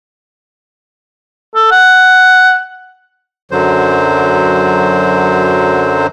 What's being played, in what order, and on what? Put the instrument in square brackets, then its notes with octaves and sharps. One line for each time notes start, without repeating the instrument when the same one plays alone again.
[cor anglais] A4
F#5
[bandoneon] F#2 D3 F#3 C5